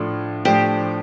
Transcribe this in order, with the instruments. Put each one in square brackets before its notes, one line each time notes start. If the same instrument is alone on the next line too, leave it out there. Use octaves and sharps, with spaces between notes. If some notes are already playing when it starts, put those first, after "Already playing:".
Already playing: [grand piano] A2 F3 D4 [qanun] F4 A4
[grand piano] A2 F3 A3 D4 [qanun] G4 C5